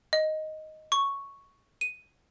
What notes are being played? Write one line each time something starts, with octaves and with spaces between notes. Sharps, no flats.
D#5
C#6
D#7